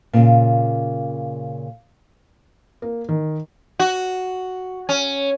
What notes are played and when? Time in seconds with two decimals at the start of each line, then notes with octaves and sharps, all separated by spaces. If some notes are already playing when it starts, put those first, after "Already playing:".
0.13 A#2 C#3
2.82 A#3
3.09 D#3
3.80 F#4
4.89 C#4